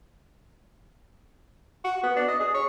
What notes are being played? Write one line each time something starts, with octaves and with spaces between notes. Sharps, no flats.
F#4
B3
D4
D#5
G#4
C#5